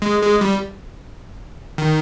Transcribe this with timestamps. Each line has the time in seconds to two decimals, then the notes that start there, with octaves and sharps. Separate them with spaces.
0.02 G#3
0.22 G#3
0.41 G3
1.78 D#3